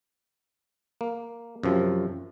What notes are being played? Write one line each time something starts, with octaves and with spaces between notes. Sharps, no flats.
A#3
F#2 C3 F3